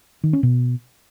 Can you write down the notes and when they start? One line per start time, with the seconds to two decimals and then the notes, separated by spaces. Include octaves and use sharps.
0.23 D#3
0.33 C#4
0.43 B2